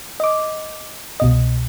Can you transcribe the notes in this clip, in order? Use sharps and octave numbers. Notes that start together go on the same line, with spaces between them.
D#5 D6
C2 B2 D#5